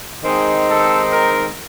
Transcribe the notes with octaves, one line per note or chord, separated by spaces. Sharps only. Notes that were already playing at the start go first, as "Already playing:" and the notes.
D#3 G#3 C4 D#4 G#4
A4
A#4